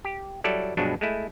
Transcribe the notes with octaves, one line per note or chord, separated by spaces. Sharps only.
G4
F#3 G3 E4 A4 D5
G2 B2 F3 F#3 G#3 D4
G#3 A3 E4